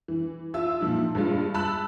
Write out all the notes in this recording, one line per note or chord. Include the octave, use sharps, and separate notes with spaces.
E3
F4 E5 E6
A#2 F3 D#4
G2 G3 G#3 F4
A5 B5 E6 F#6